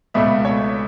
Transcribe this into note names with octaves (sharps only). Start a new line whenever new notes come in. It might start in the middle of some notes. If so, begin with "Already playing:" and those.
C#2 B2 A3 E5
C#5